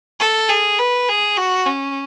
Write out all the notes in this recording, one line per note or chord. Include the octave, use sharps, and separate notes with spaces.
A4
G#4
B4
G#4
F#4
C#4